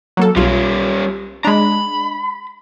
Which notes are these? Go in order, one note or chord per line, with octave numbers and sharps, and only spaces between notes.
F#3 A#3 A4
B1 G3 C#4 F4
G#3 D4 A#5 B5